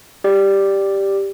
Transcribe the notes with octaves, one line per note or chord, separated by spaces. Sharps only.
G4 D5